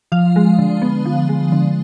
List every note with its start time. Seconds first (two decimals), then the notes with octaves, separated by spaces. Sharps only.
0.12 F3 F5
0.36 G#3
0.59 D3
0.82 B3
1.05 F3
1.29 G#3
1.52 D3